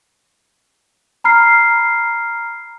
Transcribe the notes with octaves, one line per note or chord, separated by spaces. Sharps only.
A#5 B5 F6 C7